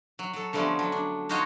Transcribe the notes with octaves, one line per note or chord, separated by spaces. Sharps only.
F#3
F#3 A4
D3 F3 G3 A3 B3 C#4
F#3
D4
D#4 F4 F#4 C5 C#5 D#5